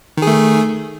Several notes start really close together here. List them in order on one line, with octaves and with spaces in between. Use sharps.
D#3 G#4 A3